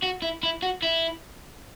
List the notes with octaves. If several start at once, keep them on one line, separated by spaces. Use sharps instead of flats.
F#4
E4
E4
F#4
E4